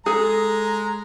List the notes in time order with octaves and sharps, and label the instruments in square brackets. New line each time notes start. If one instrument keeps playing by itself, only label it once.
[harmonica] G#3 A#5 [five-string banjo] G#4 A4